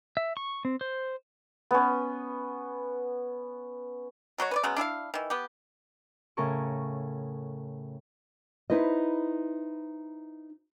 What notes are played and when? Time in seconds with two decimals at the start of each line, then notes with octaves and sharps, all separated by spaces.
0.17 E5
0.37 C#6
0.65 C4
0.81 C5
1.71 B3 C#4
4.38 B2 F#3 F#4 C#5
4.51 B4 C#5 D5
4.63 C#3 F#3 G#3 B3
4.77 D4 E4 G#4 F5
5.14 D#3 E3
5.30 B3 G4
6.37 A2 C#3 A4 A#4 C#6
8.70 D#4 E4 B4 C5 D#5